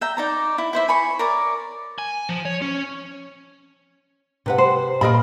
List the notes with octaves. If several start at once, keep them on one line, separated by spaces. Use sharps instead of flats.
E5 G5 A#5
D#4 D5 A#5
E4
E4 C5 E5
G#5 B5 C#6
A#4 C#5 D5
G#5
F3
C#5
C#4
C3 B4 F#5
C5
A#2 A#4 D#5 B5